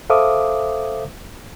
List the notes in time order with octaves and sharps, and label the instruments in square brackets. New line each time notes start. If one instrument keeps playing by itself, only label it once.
[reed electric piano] A4 C5 E5 F5 D6 D#6